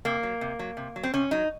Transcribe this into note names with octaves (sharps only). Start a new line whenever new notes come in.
C3 A#3
F#3
C3
F#3
C3
F#3
C4
C3 C#4
F#3 D#4